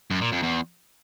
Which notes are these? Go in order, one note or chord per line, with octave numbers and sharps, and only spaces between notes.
F#2
A#2
F2
E2